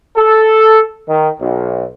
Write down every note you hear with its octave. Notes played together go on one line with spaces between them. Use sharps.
A4
D#3
B1